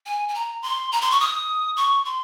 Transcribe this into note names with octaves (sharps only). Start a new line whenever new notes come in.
G#5
G#5
A#5
C6
A#5
C6
C#6
D#6
C#6
C6